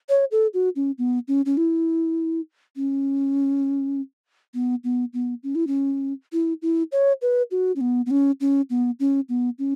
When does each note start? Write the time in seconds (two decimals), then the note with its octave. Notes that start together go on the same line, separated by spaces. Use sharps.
0.09 C#5
0.31 A4
0.54 F#4
0.76 C#4
0.98 B3
1.28 C#4
1.46 C#4
1.57 E4
2.76 C#4
4.54 B3
4.84 B3
5.14 B3
5.43 C#4
5.55 E4
5.67 C#4
6.33 E4
6.62 E4
6.92 C#5
7.22 B4
7.51 F#4
7.76 C#4
7.81 B3
8.06 B3
8.11 C#4
8.41 C#4
8.70 B3
9.00 C#4
9.29 B3
9.59 C#4